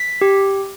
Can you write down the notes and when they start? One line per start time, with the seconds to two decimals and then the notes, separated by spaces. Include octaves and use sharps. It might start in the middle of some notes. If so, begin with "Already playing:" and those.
Already playing: B6
0.21 G4